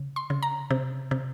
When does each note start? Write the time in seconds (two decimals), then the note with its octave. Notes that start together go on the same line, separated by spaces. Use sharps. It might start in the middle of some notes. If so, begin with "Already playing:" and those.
Already playing: C#3
0.16 C6
0.30 C#3
0.42 A#5
0.71 C3
1.11 C3